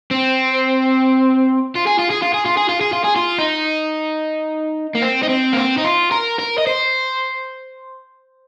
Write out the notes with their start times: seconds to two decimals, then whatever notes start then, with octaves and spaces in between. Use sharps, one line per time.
0.11 C4
1.75 F4
1.87 G#4
1.99 F4
2.10 G#4
2.22 F4
2.34 G#4
2.46 F4
2.57 G#4
2.69 F4
2.81 G#4
2.93 F4
3.04 G#4
3.16 F4
3.38 D#4
4.95 A#3
5.02 C4
5.23 D#4
5.30 C4
5.53 A#3
5.57 C4
5.78 D#4
5.84 F4
6.12 A#4
6.39 A#4
6.58 D#5
6.67 C5